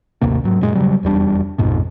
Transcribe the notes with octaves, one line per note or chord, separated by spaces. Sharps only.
A1 D#2 C3 A#3
G#2 F#3
F#2 A#2 G#3
E1 C#3 F#3 G3
F1 E2 G3 D4
A#1 F2 G#2 B2